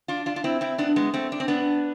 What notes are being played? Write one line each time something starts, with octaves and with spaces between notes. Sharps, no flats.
D4 F4
D4 F4
F4
C4 E4
C4 E4
B3 D4
G#3 B3
A3 C4
D4
C4
B3 D4